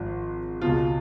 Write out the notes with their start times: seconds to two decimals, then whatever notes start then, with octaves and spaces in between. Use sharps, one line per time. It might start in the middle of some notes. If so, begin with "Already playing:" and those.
Already playing: G#1 G#2 F3
0.61 C#2 B2 F4